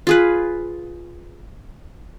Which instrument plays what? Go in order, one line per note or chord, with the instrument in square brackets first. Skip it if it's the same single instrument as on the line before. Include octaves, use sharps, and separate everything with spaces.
[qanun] F4 G#4 B4